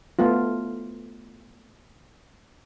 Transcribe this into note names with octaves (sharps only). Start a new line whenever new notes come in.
A3 B3 F4